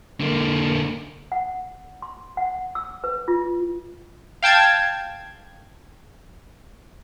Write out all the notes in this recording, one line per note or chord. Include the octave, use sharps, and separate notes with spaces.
D3 A#3
F#5
C6
F#5
E6
B4
F4
F5 G5 A5 G#6